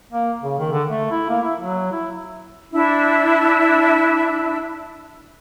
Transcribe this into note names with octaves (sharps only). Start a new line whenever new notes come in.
A#3
C#3
D#3
D3
A3
E4
A#3
E4
F#3
E4
D4 E4